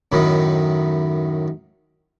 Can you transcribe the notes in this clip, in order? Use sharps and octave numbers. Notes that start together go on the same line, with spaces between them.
F#2 A2 D#3